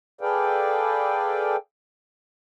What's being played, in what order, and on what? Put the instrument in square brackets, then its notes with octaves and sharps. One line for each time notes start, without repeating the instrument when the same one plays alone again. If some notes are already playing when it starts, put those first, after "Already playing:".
[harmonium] G#4 A4 B4 D5 F5 G5